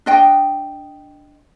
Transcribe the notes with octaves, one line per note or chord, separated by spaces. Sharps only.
D4 D#5 G5